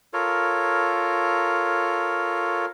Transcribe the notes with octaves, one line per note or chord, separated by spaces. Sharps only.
F4 A4 A#4 C#5